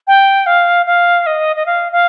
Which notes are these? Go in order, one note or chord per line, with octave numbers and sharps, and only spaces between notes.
G5
F5
F5
D#5
D#5
F5
F5